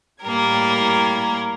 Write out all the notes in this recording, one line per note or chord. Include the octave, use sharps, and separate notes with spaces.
A2 G3 A#3 A#4 G#6